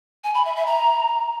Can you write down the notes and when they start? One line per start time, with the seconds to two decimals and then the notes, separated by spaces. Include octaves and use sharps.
0.24 G#5
0.35 B5
0.45 E5
0.56 E5
0.66 A#5